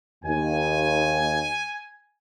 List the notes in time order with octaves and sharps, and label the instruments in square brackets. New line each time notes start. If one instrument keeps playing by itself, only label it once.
[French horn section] D#2 [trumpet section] G#5